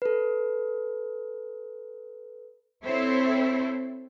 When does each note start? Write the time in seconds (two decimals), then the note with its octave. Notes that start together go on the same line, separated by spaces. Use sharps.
0.02 A4 B4
2.84 C4 E4 A4 C5 C#5